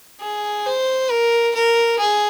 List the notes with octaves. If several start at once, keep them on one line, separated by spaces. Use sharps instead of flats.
G#4
C5
A#4
A#4
G#4